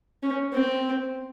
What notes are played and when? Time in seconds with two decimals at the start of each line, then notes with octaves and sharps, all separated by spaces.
0.23 C#4
0.53 C4